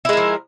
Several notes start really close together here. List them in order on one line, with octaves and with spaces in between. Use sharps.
E4 G#3 A#4 F3